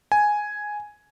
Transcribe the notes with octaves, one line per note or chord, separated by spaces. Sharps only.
G#5